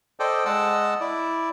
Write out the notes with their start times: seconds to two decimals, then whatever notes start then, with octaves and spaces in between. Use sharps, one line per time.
0.20 A4 C5 D5 D#5 G5
0.45 G#3 D#5 F#5 A5 E6
1.01 E4 D5